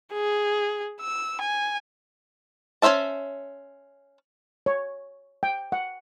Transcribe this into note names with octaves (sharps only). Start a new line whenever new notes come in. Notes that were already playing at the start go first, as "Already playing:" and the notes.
G#4
E6
G#5
C#4 A#4 C5 E5 A5
C#5
G5
F#5